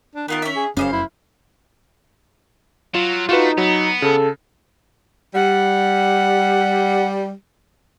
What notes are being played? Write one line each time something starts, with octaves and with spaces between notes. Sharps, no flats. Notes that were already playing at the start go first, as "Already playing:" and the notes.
D4
D#3 B3 F4 A#4
C#4 E5
G#4
F1 F#2 C#3 C#4 C5 D#5 F5
E4
F#3 F4 E7
A3 D#4 F4 F#4 B4
F#3 B3
C#3 A4
G3 F#5